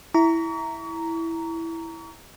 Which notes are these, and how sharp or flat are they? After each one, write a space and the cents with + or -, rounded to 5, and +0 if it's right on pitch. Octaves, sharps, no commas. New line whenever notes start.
E4 +0 A#5 -5 C#6 +40